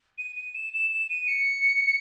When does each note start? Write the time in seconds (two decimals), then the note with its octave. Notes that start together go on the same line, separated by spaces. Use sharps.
0.18 D#7
0.36 D#7
0.55 E7
0.74 E7
0.91 E7
1.10 D#7
1.27 C#7